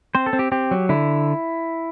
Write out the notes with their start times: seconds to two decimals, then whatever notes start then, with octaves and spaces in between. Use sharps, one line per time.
0.15 C4 C5
0.26 A4
0.33 C4
0.39 G4
0.52 C4 G4
0.71 F#3
0.89 D3 E4